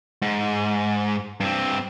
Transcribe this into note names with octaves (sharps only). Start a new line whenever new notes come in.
G#2
G2 C4